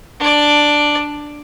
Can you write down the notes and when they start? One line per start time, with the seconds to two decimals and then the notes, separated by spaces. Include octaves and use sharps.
0.20 D4 D5